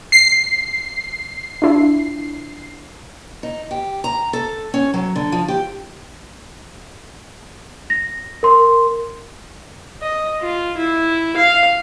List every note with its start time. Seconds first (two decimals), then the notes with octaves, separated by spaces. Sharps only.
0.12 C7
1.62 D4 E4 F4
3.43 D#4
3.71 G4
4.04 A#5
4.33 A4
4.74 C#4
4.94 F#3
5.16 D3
5.32 F3
5.48 G4
7.90 A#6
8.43 A#4 C6
10.02 D#5
10.42 F4
10.77 E4
11.36 F5